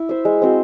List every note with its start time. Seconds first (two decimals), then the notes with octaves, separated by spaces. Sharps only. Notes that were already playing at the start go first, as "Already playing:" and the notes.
Already playing: E4
0.09 C5 E5
0.25 G#3
0.42 C4 F#4 C5